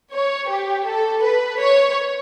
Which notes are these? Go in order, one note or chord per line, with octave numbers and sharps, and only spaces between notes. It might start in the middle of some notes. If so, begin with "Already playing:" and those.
C#5
G4
A4
B4
C#5